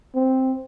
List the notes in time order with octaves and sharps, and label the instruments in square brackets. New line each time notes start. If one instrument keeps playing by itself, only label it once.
[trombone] C4